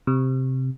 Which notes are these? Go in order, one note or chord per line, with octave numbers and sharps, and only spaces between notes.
C3